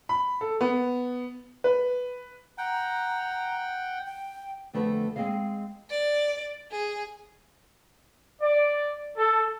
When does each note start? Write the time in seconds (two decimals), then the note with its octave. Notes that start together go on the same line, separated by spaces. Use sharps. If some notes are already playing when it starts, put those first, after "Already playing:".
0.09 B5
0.41 A4
0.61 B3
1.64 B4
2.58 F#5 G5 A#5
4.06 G5
4.73 F2 D3 A3 B3 F#4 B4
5.16 G#3 A#3 C4 G#4 D#5 F5
5.90 D5
6.71 G#4
8.42 D5
9.17 A4